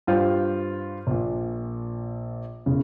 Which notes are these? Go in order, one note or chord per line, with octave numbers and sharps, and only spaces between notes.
G2 F4 C5 G5
A#1 A#2
E1 C#3